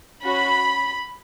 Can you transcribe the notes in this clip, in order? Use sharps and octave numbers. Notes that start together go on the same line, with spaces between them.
C#4 F#4 B5